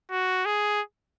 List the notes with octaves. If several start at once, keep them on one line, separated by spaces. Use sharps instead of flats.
F#4
G#4